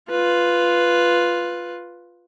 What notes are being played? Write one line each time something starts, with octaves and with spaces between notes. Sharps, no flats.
F4 B4